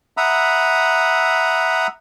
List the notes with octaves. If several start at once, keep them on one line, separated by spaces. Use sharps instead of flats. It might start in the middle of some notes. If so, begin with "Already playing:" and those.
E5 F#5 A#5 B5 D#6